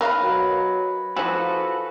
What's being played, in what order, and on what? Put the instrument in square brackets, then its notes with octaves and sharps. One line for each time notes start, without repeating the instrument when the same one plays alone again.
[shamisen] D#3 A#4 F5 [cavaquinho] B4 D#5
[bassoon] F#3
[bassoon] F3 [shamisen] E4 G#4 [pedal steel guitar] F#4 A4 B4